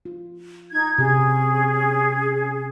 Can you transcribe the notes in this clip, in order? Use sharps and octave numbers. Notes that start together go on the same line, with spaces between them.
F4
D#4 G#6
C3 C#4 G#4